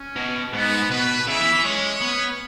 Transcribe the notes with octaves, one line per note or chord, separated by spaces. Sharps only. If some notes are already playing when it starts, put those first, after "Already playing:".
Already playing: C#4
B2
G#2 B3
B2 B3 B4
C#3 E4 E5
E3
E3
G#3 C#4 C#5
B3